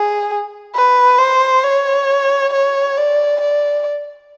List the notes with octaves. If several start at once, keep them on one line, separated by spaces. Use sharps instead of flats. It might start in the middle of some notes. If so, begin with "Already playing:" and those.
Already playing: G#4
B4
C5
C#5
C#5
D5
D5